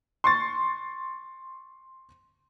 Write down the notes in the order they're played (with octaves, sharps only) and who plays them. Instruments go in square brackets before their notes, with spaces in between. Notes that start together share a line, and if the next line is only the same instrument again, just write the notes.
[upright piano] C6 C#6 A6